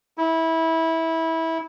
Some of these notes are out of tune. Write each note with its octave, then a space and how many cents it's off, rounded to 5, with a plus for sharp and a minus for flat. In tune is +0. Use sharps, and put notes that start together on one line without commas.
E4 -20